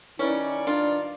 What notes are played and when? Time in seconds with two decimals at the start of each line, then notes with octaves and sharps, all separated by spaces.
0.19 D#3 G3 C#4 D#4 E4 B4 D5
0.67 D4 F4